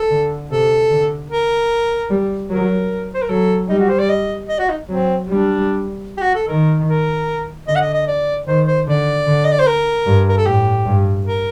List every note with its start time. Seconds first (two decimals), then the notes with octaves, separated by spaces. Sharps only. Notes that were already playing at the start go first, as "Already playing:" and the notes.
Already playing: A4
0.10 D3
0.50 C3 A4
0.90 D3
1.30 A#4
2.10 G3
2.50 F#3 A#4
3.15 C5
3.22 A#4
3.29 F#3 A4
3.69 G3 D#4
3.79 F#4
3.89 C5
3.99 D5
4.09 D#5
4.49 D#5
4.59 F#4
4.69 D#4
4.89 F#3 C4
5.28 G3 D4
6.17 G4
6.21 F#4
6.35 A4
6.48 D#3 A#4
6.88 A#4
7.68 D3 D#5
7.76 F#5
7.80 D#5
7.93 D#5
8.08 D5
8.47 D#3 C5
8.67 C5
8.87 D3 D5
9.27 D3
9.44 D#5
9.51 D5
9.59 C5
9.67 A#4
10.06 G2
10.28 A#4
10.37 A4
10.46 A2 G4
10.86 G2
11.26 A#4